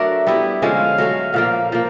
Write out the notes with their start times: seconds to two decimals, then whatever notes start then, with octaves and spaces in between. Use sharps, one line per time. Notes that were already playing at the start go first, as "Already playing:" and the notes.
Already playing: F#3 A3 D4 F#4 A#4 E5
0.27 G3 B3 E4 G4
0.62 D3 F3 G#3 C#4 F5
0.98 F#3 A3 C#4
1.33 A#2 F3 A#3 F5
1.72 F3 A#3